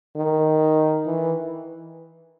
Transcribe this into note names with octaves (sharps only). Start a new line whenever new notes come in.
D#3
E3